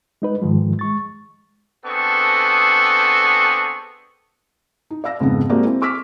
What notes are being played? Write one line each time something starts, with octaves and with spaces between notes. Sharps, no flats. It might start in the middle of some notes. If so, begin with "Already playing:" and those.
G#3 D#4 B4 D#5
G#2 D#3 F3 G#3
G#3 C#6 A6
B3 C4 D4 G#4 A4 C#6
D#4
D5 F5 E6 A#6
F2 G#2 C#3 B3
G#3 A#3 C4 F#4 G4 D5
C4 E4
C#6 D6 E6 F6 B6